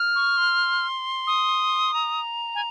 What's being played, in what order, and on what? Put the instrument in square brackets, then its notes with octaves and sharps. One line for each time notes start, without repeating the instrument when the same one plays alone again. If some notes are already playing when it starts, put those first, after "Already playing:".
Already playing: [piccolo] F6
[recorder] C#6
C6
[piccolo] D#6
[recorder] A#5
[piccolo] G#5